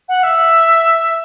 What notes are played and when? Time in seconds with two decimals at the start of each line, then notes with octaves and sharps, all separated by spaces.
0.08 F#5
0.23 E5